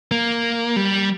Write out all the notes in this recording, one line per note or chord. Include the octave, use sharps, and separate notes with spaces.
A#3
G3